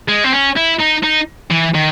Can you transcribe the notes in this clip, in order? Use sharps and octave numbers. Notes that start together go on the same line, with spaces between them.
G#3
C4
C#4
E4
D#4
D#4
E3
D#3